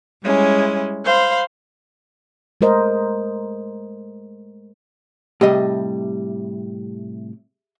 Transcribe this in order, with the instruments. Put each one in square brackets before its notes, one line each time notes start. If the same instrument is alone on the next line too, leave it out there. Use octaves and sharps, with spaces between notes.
[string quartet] G3 G#3 C#4 E4
C5 F5 B5
[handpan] G#3 A3 A#4 C5 D#5
[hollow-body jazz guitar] A2 C3 G3 [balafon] G4 [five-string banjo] G#4 D#5 E5